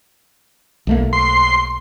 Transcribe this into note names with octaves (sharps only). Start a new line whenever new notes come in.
B1 A3 A#3
C6